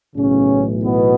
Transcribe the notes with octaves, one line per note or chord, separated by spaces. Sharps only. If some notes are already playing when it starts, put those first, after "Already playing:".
B1 A2 C#3 E3 C#4
B2 B3